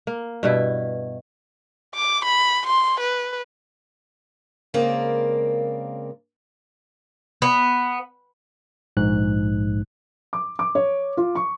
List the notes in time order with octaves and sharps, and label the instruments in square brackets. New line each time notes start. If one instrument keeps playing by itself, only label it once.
[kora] A#3
G2 B2 E4
[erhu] D6
B5
C6
B4
[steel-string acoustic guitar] C#3 G#3 A#3 C4 A#4 D5
[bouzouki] B3
[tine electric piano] A#1 G#2 F#6
[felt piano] D6
D6
C#5
F4
C#6